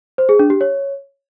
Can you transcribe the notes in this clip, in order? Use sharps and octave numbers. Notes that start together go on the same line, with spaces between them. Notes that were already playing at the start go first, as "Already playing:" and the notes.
C5
G#4
D4
G4
C#5